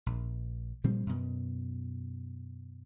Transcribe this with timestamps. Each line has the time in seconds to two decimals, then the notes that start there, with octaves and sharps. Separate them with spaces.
0.06 A#1
0.84 A#2 F3 G3 C4
1.06 F#2 B2